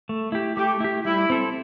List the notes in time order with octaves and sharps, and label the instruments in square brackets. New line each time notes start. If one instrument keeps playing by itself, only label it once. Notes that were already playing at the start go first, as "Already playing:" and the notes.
[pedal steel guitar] A3
E4 G4
[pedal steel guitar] A3 [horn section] G4
[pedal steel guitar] E4 G4
[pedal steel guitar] G3 [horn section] E4
[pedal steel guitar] C4 A4